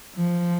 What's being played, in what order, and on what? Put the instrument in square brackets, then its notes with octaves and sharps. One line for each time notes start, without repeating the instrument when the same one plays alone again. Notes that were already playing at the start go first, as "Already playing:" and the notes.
[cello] F3